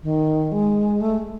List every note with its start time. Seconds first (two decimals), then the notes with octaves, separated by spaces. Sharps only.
0.03 D#3
0.52 G#3
1.00 A3